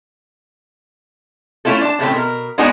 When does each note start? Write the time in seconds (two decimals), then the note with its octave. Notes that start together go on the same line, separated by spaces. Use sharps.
1.65 A3 C#4 E4 F4 A4
1.81 D4 A5
1.99 A2 C#3 A3 C4
2.12 B2 A#4
2.58 G#3 B3 D4 D#4 F#4 G#4